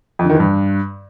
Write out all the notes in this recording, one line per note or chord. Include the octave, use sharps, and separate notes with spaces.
F2
D3
D#3
E3
G2